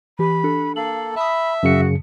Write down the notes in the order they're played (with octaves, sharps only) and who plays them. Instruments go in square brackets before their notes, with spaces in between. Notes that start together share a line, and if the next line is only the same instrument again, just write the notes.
[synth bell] E3 G4 [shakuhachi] B5
[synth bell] D4 A4
[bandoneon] A#3 A4 [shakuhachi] F5 [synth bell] F#7
[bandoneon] E5 [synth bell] A5 D#6 [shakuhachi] B5
[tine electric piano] F#2 C#3 C#7 [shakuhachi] F#4